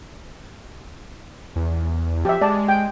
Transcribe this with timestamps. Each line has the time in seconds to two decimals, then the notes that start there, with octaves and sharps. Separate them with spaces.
1.56 E2
2.25 F3 G4 E5
2.41 G#3 D5 A5
2.69 G5